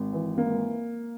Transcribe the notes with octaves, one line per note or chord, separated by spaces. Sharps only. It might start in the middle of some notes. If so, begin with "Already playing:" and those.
Already playing: G#1
E3
G#1 A#3